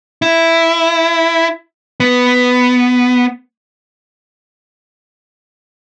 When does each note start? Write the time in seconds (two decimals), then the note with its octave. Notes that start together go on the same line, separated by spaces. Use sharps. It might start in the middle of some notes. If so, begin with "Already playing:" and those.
0.22 E4
2.00 B3